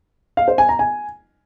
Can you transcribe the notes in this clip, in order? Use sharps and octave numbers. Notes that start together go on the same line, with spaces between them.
F5
C5
G#5
A#5
G#5